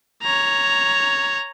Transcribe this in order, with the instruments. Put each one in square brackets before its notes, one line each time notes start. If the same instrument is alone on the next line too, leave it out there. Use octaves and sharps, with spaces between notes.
[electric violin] C#5 A#5